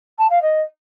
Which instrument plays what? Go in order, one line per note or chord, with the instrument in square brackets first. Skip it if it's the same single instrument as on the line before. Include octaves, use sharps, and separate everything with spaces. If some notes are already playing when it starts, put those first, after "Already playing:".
[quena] A5
F5
D#5